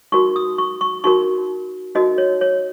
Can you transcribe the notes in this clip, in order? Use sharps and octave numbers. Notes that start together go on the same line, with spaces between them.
D#4 F#4 A#4 C#6
D#6
C#6
C#6
D#4 F#4 A#4 C#6
D#4 F#4 A#4 D#5
C#5
C#5